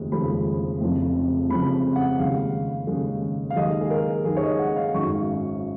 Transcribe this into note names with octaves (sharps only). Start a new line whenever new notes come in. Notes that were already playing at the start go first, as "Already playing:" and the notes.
Already playing: F1 D#2 C#3 G#3
F1 D#2 C#3 F3 G#3 B5
F1 F2 C#3 F3
F1 F2 C#3 F3 B5
F#5
D#2 C#3 G#3 F5
D#2 C#3 G#3
F5
D#2 D#3 G#3 D#5
G#4
A#4
D#2 D#3 G#3 G#4
C#5
D#5
F#5
F5
G#1 F#2 D#3 C#6